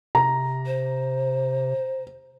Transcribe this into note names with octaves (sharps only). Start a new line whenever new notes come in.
C3 A#5
C5